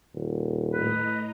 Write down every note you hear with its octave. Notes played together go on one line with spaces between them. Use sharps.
D#1
A2 B4 D#5 A#5